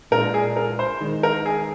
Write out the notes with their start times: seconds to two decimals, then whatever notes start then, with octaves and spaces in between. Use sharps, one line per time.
0.11 A#2 G#3 D4 F4 A#4
0.34 G#4
0.56 A#4
0.79 C5
1.01 D#3 G#3 D#4
1.23 A#4
1.46 G#4